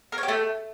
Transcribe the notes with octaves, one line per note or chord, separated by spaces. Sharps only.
A#4
C#5
G4
A3